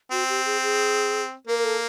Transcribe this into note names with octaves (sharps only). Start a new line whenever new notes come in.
C4 F#4
G4
G#4
G#4
A#3 A#4
A#4
A4